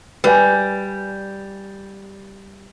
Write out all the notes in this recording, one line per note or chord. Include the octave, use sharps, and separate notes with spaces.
G3 B4 G#5